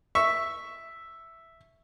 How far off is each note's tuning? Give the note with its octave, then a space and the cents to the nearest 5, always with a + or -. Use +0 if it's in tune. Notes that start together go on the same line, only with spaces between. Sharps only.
E5 +0 C#6 +0